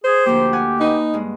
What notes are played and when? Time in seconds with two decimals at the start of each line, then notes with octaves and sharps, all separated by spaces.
0.04 G#4 C5
0.26 D2 F3 A#3 G4
0.53 F#5 G#5
0.81 D#4 B4 D#5
1.14 G2 G#3